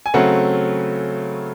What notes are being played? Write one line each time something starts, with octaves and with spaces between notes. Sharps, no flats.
G#5
C#3 F#3 A3 C4 F#5